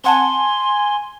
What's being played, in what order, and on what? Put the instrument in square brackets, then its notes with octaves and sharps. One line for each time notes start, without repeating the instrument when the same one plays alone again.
[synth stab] C4 F#5 A5 [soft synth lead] G#5 [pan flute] C6